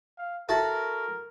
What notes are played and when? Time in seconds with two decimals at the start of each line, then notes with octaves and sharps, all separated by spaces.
0.18 F5
0.49 E4 F#4 A4 A#4